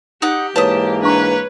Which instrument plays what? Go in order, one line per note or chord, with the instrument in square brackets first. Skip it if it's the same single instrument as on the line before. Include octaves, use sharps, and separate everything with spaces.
[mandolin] D#4 F#5 [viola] G4
[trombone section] G#2 E3 A#3 [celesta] B4 C#5 B6 [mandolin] A5 D#6
[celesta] D4 A#5 C#6 [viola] B4 C#5